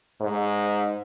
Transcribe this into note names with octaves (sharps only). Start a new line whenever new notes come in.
G#2